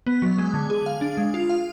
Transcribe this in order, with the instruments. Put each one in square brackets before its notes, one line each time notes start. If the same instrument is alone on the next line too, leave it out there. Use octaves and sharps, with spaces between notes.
[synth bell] B3
F#3
G#3
D3
G#4
F5
D4
G#3
F4
F5